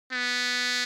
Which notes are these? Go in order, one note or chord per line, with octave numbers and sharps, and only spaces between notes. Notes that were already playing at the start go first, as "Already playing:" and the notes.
B3